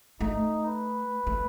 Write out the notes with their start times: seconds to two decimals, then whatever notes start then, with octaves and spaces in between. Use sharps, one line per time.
0.21 A3 D#4
0.66 B4
1.27 A3